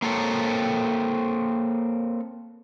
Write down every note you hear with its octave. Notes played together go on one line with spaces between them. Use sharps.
A#3 C4 A4 C#5